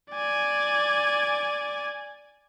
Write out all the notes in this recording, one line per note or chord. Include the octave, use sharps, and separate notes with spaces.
D5 G#5